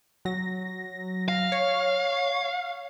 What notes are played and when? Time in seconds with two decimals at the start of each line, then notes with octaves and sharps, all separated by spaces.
0.25 F#3 A#6
1.28 F5
1.52 C#5